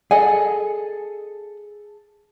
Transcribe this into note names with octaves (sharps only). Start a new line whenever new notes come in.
G#4 A4 D#5 F#5 G#5